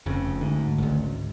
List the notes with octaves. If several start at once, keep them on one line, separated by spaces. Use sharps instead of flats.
F1 F2 C#3
D2 G#2
G#1 C#2